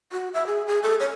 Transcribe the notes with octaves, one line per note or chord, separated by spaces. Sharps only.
F#4
E5
G#4
G#4
A4
C#5